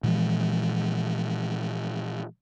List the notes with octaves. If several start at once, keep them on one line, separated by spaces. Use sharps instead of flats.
A#2 E3 F3 G#3